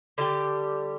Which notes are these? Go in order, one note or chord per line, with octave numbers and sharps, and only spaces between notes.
D3 G3 G4